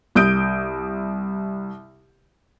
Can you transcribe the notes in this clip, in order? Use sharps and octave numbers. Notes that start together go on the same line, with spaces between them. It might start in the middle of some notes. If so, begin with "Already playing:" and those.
C2 D#6 G6 D7